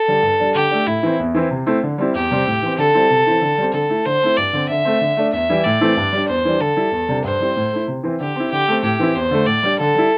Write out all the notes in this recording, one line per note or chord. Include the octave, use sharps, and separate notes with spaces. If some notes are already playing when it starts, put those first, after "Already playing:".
Already playing: A4
D3 G3 D4
G2
G3 D4
D3 G4
A3 D4
A2 E4
E3 C4
E2
E3 C4 E4
C3
A3 C4 E4
D3
G3 C4 E4
E2 G4
C3 G3 C4
A2
E3 C4
D3 A4
G3 C4 E4
C3
E3 C4 E4
D3
G3 C4
D3 A4
A3 E4
D3 C5
A3 C4 E4
G2 D5
D3 C4
D3 E5
A3 C4
D3
A3 D4
E2 E5
E3 G3 E4
A2 D5
E3 A3 C4 E4
G2
G3 D4
E2 C5
E3 G3 D4
D3 A4
G3 E4
E2
C3 G3 D4
G2 C5
G3 C4 E4
A2
A3 E4
C3
E3 C4 E4
D3 G4
C4 E4
D3 G4
A3 C4
A2 G4
E3 C4 E4
E2 C5
D3 A3
A2 D5
G3 D4
D3 A4
G3 E4